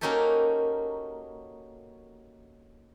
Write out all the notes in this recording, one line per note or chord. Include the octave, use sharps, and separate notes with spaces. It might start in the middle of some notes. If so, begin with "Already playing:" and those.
A#3 C#4 D#4 F#4 G4 A4